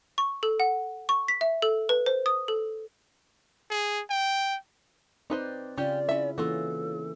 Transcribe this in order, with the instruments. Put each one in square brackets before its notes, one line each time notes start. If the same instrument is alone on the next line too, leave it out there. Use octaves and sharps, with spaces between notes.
[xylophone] C#6
A4
F#5
C#6
B6
E5
A4
B4
C5
D#6
A4
[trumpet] G#4
G5
[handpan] C4 D5 [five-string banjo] D#4 B4 C5
[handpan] C#3 F4 [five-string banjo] C#4 G4 [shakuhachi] D5
[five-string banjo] C#4 E5 [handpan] E4
[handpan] E3 A#3 C#4 [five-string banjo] F4 F#4 [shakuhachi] A4